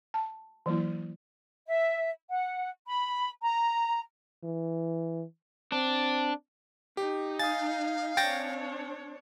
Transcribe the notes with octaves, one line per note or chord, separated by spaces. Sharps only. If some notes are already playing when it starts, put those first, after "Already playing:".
A5
E3 F#3 A#3 E4
E5
F#5
B5
A#5
E3
C4 D4
D#4 G4
F5 G#5 D#6 A6
C4 D4 C#5 G5 A6 A#6